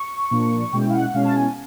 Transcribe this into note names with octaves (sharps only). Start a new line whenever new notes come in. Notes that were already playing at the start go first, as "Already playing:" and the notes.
Already playing: C#6
A#2 F3 A#3 D4
B2 G#3 C#4 E4 G5
F5
F#5
B2 G#3 C#4 E4 F5
A5
G#5